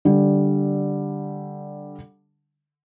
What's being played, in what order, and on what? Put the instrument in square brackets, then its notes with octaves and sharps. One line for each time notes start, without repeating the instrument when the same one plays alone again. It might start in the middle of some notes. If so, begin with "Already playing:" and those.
[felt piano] D3 G3